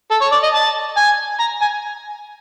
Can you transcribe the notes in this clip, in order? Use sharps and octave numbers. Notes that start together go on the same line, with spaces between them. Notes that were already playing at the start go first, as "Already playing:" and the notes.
A4
C#5
D5
D#5
A5
G#5
A#5
G#5